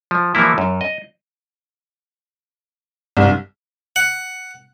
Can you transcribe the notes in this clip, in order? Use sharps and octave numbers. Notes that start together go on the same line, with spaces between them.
F3
E3 F3 G3 A#3 E4
F#2
D#5
C2 G2
F#5